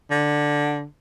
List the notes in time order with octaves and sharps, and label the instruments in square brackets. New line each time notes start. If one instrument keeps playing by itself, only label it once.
[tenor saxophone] D3